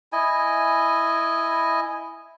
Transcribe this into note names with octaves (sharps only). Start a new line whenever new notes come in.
E4 D#5 G#5